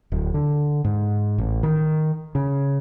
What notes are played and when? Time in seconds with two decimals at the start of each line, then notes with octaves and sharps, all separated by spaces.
0.12 D1
0.34 D3
0.85 G#2
1.38 A1
1.63 D#3
2.35 C#3